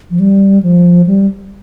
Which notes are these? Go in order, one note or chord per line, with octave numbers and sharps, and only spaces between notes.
F3
G3
F3
G3